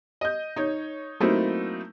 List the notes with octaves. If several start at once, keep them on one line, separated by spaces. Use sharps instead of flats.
D#5 G6
D#4 C#5
F#3 A3 A#3 C4 D#4 E4